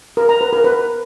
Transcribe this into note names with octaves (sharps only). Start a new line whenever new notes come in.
A#4
A#5
B4
A#4
B4